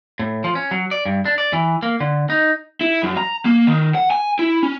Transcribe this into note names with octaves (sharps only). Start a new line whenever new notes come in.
A2
F3
C#4
F#3
D5
G2
D4
D5
E3
A#3
D3
D#4
E4
F#2
A#5
A#3
D#3
F#5
G#5
E4
C#4